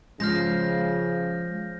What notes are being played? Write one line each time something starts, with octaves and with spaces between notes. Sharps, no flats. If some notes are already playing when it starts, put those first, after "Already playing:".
C#3 F3 G#3 F6 G6 A#6